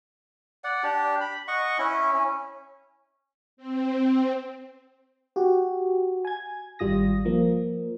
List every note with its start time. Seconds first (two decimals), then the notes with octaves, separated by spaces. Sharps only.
0.64 D5 F#5
0.83 D4 G4
1.20 B5
1.48 D#5 F#5 C#6
1.78 C#4 E4
2.14 C#4
3.57 C4
5.36 F#4 G4
6.25 G#5 G#6
6.79 G#1 G3 F4 D#6 A#6
7.25 F3 A#3